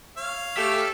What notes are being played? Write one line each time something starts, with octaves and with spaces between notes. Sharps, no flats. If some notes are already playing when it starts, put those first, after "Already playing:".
C#5 F5
A3 G4 A4 E5